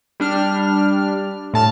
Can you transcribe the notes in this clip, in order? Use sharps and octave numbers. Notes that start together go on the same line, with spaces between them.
G3 D4 F6
A2 A5 F6